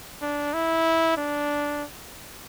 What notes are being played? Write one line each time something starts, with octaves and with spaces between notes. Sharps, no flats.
D4
E4
D4